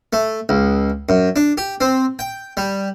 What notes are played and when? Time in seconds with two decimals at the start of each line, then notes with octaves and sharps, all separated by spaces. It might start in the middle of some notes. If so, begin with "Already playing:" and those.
0.13 A3
0.49 C#2
1.09 F#2
1.36 D4
1.58 G4
1.81 C4
2.19 G5
2.57 G3